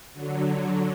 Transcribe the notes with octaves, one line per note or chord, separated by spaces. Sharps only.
D3 F#3